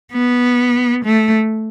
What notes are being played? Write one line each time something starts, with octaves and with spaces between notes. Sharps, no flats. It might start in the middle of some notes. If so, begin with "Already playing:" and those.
B3
A3